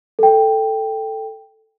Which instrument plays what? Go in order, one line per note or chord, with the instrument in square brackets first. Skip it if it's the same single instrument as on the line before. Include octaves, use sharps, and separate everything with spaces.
[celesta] A4 G5